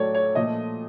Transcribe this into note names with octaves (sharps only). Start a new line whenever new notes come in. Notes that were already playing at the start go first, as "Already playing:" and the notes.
Already playing: A2 F#3 A3 C#5 D5
C#5
A#2 F3 A3 D#5